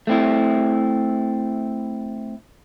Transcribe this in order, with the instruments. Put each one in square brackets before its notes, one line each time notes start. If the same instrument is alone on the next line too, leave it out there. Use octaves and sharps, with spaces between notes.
[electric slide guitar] A3 C4 E4